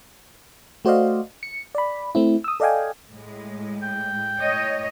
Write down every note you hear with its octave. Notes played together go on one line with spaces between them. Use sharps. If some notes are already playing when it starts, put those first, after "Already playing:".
A3 F#4 C5 D5 D#5 F5
C#7
D5 B5
A3 C4 E4
D#6 E6
A4 D5 D#5 F5 G5 G#5
A2 G#3
G5
A2 C#5 D#5